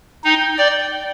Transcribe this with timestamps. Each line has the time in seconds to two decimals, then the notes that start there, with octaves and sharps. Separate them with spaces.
0.24 D#4 G5
0.58 D5 G5
0.91 G5